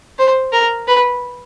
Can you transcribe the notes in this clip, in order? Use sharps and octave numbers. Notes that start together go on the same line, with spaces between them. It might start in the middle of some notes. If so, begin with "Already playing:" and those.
C5
A#4
B4